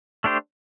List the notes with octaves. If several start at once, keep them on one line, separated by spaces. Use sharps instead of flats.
A3 D4 G4 C5